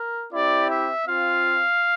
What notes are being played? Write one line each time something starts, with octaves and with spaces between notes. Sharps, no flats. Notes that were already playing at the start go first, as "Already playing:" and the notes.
Already playing: A#4
C4 E4 G4 D5
E5
C4 F4 F5